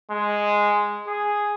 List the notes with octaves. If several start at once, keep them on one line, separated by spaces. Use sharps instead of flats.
G#3
G#4